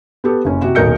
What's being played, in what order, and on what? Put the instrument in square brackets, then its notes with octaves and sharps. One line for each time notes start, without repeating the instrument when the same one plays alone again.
[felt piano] B3 G4 A4
F#1 C#4
C3 F#4
D#1 B1 A#4 D#5 G6 C#7